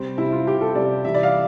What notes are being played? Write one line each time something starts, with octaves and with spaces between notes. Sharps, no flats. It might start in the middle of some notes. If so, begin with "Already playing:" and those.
Already playing: C3 G3 C4
C3 G3 E4
F4
C3 G3 G4
A4
C3 G3 D5
C3 E3 G3 E5
D5
F5